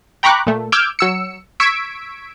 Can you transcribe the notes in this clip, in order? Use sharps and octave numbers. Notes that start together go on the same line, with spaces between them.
G5 A#5 B5 C#6 D6 F#6
A#2 A3
D6 E6 F6 G6 G#6 D7
F#3 E6 C#7
C#6 E6 G#6 B6 D7